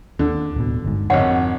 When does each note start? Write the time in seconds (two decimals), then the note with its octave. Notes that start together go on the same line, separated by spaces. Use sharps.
0.19 D#2 D3
0.56 D1 B2
0.84 G1 G#2
1.10 G#1 F2 D3 C#5 F#5